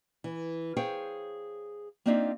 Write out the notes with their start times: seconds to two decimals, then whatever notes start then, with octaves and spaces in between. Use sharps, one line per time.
0.24 E3
0.77 G#4 C5 C#5 F5 G5
2.06 A#3 C4 D4 D#4 F4 E5